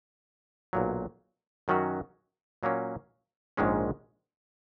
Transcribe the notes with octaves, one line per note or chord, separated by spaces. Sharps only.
B1 A#2 F#3
F#2 D#3 F#3 C#4 F#4
A#2 F#3 A#3 C#4
A#1 G#2 D#3 G#3 C#4